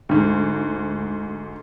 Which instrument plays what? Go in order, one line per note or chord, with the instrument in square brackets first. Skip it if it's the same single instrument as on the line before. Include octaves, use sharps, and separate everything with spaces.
[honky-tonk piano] D2 G#2